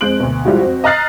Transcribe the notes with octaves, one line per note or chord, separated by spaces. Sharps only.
F2 G#3 C5 F#6 D7 F#7
D2 B2
F3 G3 G#3 E4 F#4
F2 C4 F#4
D#5 A#5 F6 F#6 A6 C7